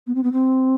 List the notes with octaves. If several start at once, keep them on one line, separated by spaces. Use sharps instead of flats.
B3
C4
B3
C4